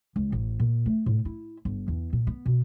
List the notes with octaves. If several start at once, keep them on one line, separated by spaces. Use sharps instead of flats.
C#2
A1
A#2
A3
A2
E4
G1
E2
A#2
B3
B2